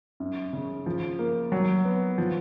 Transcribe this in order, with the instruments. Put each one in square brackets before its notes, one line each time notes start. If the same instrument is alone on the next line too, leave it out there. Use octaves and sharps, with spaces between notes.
[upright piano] F#2
C#3
F3
A#3
F#3
B3
F3